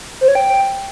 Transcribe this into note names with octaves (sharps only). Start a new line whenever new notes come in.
C5
C#5
G5